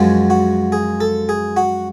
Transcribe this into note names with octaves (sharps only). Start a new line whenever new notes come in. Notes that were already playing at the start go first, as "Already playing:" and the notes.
Already playing: F#2 F3 G#3 F#4
F#4
G#4
A4
G#4
F#4